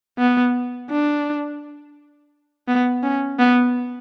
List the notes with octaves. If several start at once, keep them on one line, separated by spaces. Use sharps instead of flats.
B3
D4
B3
C#4
B3